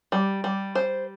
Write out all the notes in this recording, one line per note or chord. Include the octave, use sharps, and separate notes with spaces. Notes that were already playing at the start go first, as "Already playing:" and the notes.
G3
G3
C5